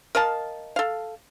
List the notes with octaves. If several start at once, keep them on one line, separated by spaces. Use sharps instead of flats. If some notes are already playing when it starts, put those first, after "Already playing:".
A#4 D#5 F5 A5
A4 F5